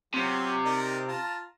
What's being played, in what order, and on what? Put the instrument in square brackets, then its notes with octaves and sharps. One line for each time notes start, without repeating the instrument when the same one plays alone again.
[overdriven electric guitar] C3 [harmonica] F#3 F4 G4
[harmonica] D#4 A#4 D5
F4 A5 A#5